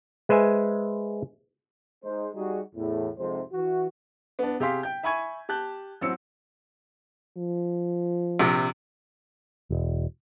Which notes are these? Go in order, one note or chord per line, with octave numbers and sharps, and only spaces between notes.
G#3 B4 C5 E5 G#5
G#3 D#4 C5
G3 D#4 F#4 G#4
E2 A2
F2 G#2 C3 C5
E3 F#4
B3 D4
C3 G4 G#4 F5 C6 B6
G5 G6
E5 G#5 B5 C#6 G#6 D#7
G4 A5 F#6 G6
A1 F#3 C4 E6 C#7
F3
A#1 C3
E1